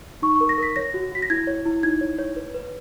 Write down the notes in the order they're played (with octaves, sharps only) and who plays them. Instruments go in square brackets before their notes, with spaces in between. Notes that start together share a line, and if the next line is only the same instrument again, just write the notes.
[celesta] D#4 C#6
A#4 C#6
A#6
A#4 B6
C#5 A#6
F#4
F#4 B6
A#6
E4 G#6
C#5
E4
D#4 G#6
C#5
C#5
B4
B4